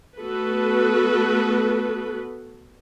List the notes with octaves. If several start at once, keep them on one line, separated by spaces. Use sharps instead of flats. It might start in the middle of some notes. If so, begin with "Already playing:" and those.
A3 B3 F#4 A4 B4